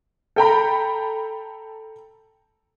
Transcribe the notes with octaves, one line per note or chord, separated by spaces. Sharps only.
A4 G5 A#5 B5